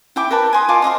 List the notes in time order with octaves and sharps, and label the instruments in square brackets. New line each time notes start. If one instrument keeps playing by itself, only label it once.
[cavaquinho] E4 G5 D6
A#4 B4 A5 B5
G#5 C6 D#6
F4 D#5 A5 D6
C5 D#5 F5 C6